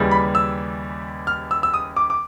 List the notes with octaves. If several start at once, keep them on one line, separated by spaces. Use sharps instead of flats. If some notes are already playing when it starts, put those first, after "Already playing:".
Already playing: D#2 C#3 E3 G3
B5
E6
F6
E6
E6
D#6
D6
D6